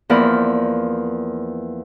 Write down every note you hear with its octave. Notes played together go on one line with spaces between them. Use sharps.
E2 F3 A#3 A#4 D5 B5